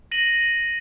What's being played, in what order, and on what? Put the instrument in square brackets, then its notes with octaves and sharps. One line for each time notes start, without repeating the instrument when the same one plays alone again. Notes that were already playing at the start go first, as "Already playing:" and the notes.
[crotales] A#6 D#7 F#7